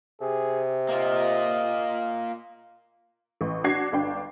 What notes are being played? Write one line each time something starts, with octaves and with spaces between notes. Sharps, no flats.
C3 G#4
A#3 F4 D#5
A1
D4 F#4 G#6 C7
G1 D4 G5